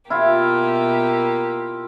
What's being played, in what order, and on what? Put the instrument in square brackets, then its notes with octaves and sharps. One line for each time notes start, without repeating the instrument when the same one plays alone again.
[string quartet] B2 A#3 G4 [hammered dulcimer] E4 F4